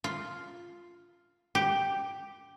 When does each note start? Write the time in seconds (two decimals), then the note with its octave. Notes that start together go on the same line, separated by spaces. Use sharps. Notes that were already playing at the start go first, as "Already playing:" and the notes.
0.04 F4
1.55 G4